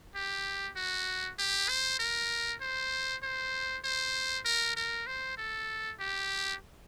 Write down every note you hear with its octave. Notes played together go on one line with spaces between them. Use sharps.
G4
F#4
G4
C5
A#4
C5
C5
C5
A#4
A#4
C5
A4
G4